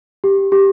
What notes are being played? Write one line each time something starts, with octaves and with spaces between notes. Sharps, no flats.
G4
G4